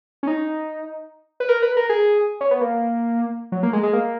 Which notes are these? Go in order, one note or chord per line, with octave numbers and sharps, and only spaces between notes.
C#4
D#4
B4
A#4
B4
A#4
G#4
C#4
B3
A#3
F#3
A#3
G#3
G#3
A#3